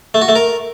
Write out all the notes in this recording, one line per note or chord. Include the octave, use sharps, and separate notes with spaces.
A3
F#4
A3
A#4